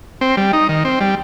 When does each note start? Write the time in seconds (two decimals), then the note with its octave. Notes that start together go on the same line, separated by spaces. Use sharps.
0.21 C4
0.37 G3
0.53 D#4
0.69 D#3
0.85 C4
1.00 G3